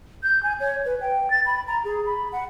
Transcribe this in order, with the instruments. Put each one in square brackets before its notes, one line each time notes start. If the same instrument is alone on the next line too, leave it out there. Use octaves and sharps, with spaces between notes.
[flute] G6
G#5
C#5
B4
G5
A6
B5
A#5
G#4
B5
F#5